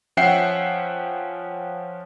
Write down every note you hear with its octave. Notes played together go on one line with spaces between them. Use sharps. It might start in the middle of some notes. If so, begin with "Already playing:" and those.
F3 C#4 E5 F#5 G5 C7